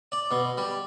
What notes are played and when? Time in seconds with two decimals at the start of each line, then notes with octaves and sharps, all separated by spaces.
0.12 D5
0.31 B2
0.58 G3